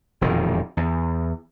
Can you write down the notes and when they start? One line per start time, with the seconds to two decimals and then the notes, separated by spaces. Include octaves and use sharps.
0.21 E1 F2 A#2 D#3
0.77 E2